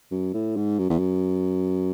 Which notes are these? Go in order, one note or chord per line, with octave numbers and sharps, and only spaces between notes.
F#2
A2
G#2
F#2
E2
F#2